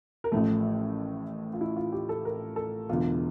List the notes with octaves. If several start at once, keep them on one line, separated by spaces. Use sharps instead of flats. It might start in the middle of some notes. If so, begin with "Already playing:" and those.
A#4
A1 A2 F3 A3 A4
F4
E4
F4
G4
A4
A#4
A4
E1 E2 D3 F4